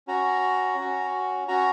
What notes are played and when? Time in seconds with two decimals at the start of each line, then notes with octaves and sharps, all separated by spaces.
0.08 C#4 F#4 A#5
0.78 C#4 F#4
1.48 C#4 F#4 A#5